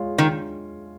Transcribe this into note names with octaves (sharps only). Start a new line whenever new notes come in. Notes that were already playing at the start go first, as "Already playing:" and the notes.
Already playing: G#3 F4 C#5 F5
D#3